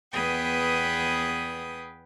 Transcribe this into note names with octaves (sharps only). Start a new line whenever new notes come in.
E2 B3 G#4 B4 G5 D#6